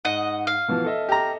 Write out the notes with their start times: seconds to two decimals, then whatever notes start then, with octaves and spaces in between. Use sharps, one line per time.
0.05 G#2 D#5 F#5
0.47 F5
0.68 B2 E3 F3
0.84 A4 D#5 E5
1.09 G4 A#5